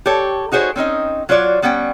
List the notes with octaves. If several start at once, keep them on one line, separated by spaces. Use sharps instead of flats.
G4 A4 C#5
D#4 F#4 G#4 C5 C#5
C4 C#4 D#4 D#5
F#3 F4 F#4 C#5 D5
G3 B3 C#4 F#5 G5